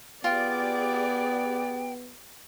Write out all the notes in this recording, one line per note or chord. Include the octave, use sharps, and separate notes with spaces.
B3 F4 G4 G#4 D5 G5